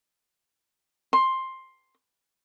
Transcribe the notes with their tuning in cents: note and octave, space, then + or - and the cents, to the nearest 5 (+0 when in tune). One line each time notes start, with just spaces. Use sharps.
C6 +10